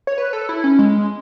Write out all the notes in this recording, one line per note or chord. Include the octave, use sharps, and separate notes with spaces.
C#5
B4
A4
E4
C#4
G#3